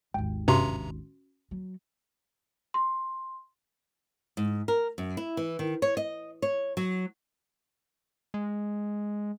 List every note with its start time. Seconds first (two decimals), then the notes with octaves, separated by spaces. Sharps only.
0.14 G#1 D#2 G5
0.48 G2 C3 C#4 F#4 A#5 C6
1.51 F#3
2.74 C6
4.37 G#2
4.68 A#4
4.98 F#2
5.17 E4
5.37 E3
5.59 D#3
5.82 C#5
5.97 D#5
6.42 C#5
6.77 F#3
8.34 G#3